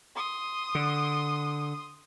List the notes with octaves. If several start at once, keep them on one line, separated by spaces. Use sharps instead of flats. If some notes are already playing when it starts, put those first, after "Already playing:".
C6 D#6
D3